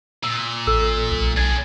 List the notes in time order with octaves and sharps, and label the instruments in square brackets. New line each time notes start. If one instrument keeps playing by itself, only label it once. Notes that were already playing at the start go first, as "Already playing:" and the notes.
[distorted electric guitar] A#2 [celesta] E6
[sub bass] A1 [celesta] A4 E6
[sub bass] B1
[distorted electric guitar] D4 G#4 [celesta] G#6